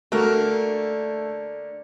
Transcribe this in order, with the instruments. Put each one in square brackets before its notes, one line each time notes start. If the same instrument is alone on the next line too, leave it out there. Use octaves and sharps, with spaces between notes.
[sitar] D3 A#3 D4 [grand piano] A3 [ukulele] F#4 A#4